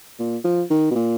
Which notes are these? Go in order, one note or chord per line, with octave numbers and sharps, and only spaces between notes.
A#2
F3
D#3
B2
A#2